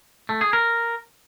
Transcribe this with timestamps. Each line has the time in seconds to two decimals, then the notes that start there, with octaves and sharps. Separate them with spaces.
0.29 A3
0.41 G#4
0.53 A#4